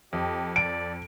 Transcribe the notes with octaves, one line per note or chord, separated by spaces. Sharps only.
F2 G4 D#5
D5 D7